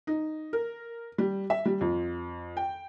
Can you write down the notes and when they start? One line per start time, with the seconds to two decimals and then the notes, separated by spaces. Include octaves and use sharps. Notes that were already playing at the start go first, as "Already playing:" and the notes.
0.07 D#4
0.53 A#4
1.18 G3
1.50 E5
1.66 G3
1.81 F2
2.57 G5